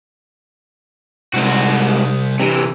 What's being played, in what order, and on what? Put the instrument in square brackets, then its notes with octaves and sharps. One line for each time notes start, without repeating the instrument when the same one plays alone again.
[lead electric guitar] C2 [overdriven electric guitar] G#2 F#4
[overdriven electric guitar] C3 E3